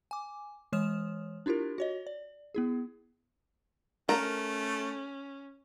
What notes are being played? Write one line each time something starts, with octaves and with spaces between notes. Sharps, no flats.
G#5 D6
E3 G#3 C#5 D#6 F6 E7
D4 E4 F4 G4 A#4
F#4 C#5 D#5
D5
B3 E4 G#4
A3 C#4 A#4